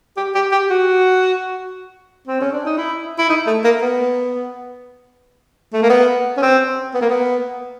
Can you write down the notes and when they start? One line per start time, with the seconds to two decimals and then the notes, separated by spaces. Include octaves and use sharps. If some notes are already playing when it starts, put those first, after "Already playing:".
0.17 G4
0.35 G4
0.52 G4
0.70 F#4
2.27 C4
2.41 C#4
2.53 D4
2.65 D#4
2.77 E4
3.19 E4
3.29 D#4
3.47 A3
3.64 A#3
3.82 B3
5.73 A3
5.83 A#3
5.90 B3
6.37 C#4
6.42 C4
6.94 B3
7.01 A#3
7.10 B3